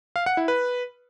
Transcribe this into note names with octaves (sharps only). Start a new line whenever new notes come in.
F5
F#5
E4
B4